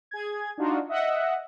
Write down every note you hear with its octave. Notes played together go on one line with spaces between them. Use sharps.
G#4 G#6
D4 D#4 F4 F#4
D#5 E5 F#5